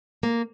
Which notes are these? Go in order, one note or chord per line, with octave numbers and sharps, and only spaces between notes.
A#3